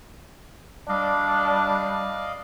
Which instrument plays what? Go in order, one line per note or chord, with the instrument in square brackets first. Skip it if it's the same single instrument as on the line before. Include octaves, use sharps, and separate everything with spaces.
[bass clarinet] G3 [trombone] D4 [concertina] D5 D#5 F5